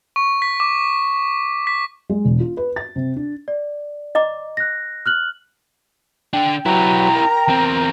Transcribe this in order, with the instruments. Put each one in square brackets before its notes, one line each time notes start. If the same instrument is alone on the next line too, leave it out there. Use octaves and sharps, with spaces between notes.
[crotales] C#6
B6
D6
B6
[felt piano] G#3
E1
F4
B4
A6
C3
D4
[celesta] D5
[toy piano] D#5 A#5 D6
[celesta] F#6 A#6
F6 F#6 F#7
[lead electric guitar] D3 D4 [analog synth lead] G5
[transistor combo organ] F#3 B4 [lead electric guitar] E4 G4 [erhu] A#5
[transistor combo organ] A#4
[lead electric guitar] E2 C4